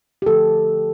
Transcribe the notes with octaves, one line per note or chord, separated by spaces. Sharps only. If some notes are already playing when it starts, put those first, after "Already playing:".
G4
D3 F3 A3 A4